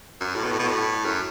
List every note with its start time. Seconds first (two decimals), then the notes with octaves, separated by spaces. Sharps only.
0.21 F#2
0.35 A2
0.44 B2
0.52 A2
0.59 B2
0.67 A2
1.05 F#2